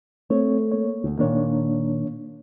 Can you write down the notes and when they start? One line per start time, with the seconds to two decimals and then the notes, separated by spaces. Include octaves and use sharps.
0.30 A3 C4 C#5
0.72 A#3 C#5
1.04 D2
1.19 A#2 D#3 A#3 D4 C#5